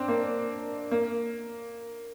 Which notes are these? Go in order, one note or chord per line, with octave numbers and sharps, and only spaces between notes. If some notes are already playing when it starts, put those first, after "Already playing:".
Already playing: C4 D4
A#3
A#3